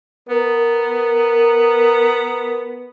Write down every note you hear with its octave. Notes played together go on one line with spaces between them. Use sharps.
B3 A#4